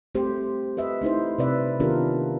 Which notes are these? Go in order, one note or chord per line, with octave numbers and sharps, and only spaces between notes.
A3 C4 G4 C5
B4 D#5 E5
A3 D#4 E4 C5
C3 C4 B4 D5 E5
D#3 B3 D4 F4 G4 A#4